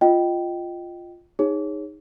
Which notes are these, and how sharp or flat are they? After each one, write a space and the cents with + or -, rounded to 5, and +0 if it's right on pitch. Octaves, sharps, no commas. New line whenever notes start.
F4 +0 D#5 +0 G5 -15
D#4 +0 G#4 -25 C#5 -10